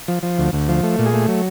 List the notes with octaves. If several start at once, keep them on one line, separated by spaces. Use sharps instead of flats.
F3
F3
D2
D2
F3
A3
A#2
G#4
A3
F#3